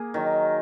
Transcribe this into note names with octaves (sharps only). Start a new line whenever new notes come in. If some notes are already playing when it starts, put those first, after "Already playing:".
Already playing: A#3 G#4
D#3 F#3